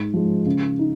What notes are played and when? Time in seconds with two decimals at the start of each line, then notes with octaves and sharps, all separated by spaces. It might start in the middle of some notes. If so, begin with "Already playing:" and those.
Already playing: G#2
0.13 F3 G#3
0.46 C#3
0.79 D#4